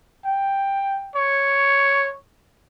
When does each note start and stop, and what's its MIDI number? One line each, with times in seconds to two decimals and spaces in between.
0.25 1.10 79
1.15 2.12 73